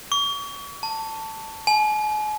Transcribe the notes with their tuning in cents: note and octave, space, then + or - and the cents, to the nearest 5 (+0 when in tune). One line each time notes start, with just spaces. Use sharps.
C#6 +35
A5 +15
G#5 +40